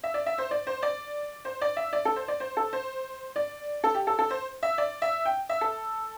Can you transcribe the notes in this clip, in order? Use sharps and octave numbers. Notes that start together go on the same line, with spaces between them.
E5
D5
E5
C5
D5
C5
D5
C5
D5
E5
D5
A4
C5
D5
C5
A4
C5
D5
A4
G4
A4
A4
C5
E5
D5
E5
G5
E5
A4